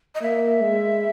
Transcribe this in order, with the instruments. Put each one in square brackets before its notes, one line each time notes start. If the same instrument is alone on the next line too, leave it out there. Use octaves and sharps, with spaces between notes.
[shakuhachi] D#5
[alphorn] A#3 [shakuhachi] E5
[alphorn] G#3